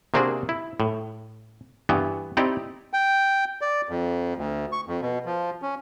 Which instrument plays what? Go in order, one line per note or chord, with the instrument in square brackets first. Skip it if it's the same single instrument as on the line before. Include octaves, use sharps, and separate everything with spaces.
[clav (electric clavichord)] C3 A#3 C4 D4 F#4 G#4
E4
A2
G2 E3 B3
C4 D#4 E4 G4 D5
[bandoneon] G5
D5
F2
D2
C#6
F2
B2
F3
C#4